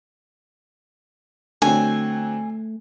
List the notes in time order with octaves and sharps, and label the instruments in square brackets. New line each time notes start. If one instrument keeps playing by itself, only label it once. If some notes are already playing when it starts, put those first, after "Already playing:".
[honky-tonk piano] D3 F#3 C4 [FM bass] A3 [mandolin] G#5